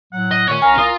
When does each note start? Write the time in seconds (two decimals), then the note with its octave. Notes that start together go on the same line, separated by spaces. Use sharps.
0.13 A2 F#3 F#5
0.31 D#5
0.49 A#2 D#3 A3 C#4 C#5
0.62 C2 A#4 F5 G#5 A#5
0.78 F4 D#6